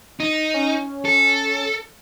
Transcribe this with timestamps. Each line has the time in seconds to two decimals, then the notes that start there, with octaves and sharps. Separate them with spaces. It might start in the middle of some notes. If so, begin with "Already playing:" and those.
0.20 D#4
0.54 C#4
1.05 A4